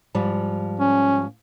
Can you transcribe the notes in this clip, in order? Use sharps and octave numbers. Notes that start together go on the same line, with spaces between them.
G#2 F3 G3
C#4